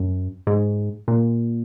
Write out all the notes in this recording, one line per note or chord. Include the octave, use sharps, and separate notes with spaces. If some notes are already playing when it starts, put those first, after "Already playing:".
Already playing: F#2
G#2
A#2